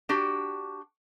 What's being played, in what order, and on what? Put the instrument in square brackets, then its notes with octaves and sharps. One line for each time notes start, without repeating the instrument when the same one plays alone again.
[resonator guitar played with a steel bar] D4 F#4 G4